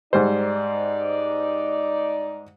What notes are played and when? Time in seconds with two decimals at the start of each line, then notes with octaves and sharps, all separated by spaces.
0.13 G#2 G3 D#4 C5 D5